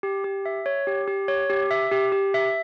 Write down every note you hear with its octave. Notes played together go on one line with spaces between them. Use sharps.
G4
G4
E5
C#5
G4
G4
C#5
G4
E5
G4
G4
E5